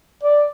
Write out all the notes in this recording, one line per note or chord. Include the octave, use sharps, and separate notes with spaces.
D5